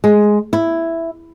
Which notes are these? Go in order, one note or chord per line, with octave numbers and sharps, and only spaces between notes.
G#3
E4